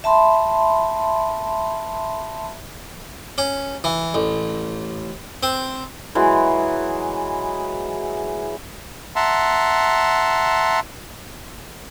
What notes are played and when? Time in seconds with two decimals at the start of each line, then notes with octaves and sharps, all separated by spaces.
0.04 E5 A5 B5 C6
3.38 C#4
3.84 E3
4.14 A1
5.43 C4
6.15 E3 F#3 G#3
9.16 E5 F#5 A5 A#5 C6